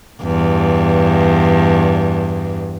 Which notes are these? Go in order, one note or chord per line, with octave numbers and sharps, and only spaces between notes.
E2 G2